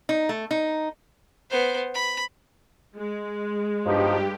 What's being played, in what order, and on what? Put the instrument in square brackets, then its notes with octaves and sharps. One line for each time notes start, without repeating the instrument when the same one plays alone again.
[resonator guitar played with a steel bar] D#4
A3
D#4
[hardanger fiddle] B3 C5
B5
[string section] G#3
[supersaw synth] G2 G4 [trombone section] B2 F3 D#4